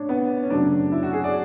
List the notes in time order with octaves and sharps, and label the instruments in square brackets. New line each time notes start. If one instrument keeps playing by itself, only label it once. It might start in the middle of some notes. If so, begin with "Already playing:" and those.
Already playing: [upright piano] A2 D4 C#5
B3
C#4
F#2 C#3 F#3 A3 D4
E4
F#4
G#4
D5